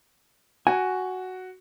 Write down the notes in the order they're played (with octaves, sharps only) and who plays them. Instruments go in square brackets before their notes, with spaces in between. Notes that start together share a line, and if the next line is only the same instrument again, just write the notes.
[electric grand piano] F#4 [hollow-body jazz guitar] G#5